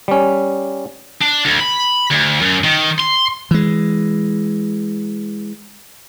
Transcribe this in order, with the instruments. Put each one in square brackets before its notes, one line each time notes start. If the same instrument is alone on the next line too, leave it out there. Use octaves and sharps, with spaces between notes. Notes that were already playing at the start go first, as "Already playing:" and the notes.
[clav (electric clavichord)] G3 C#4
[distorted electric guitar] D4
D2
B5
D2
F#2
D#3
C6
[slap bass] E3 G#3